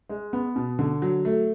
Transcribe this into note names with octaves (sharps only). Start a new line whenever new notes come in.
G#3
B3
B2
D3
F#3
A3